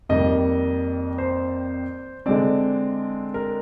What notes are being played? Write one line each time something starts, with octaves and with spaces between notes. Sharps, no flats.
F2 D#3 G3 A#3 D#5
C5
D3 G#3 C4 D5
A#4